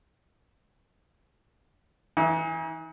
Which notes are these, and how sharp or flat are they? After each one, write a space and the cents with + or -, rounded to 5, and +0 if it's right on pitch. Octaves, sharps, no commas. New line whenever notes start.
E3 -5 D#4 +40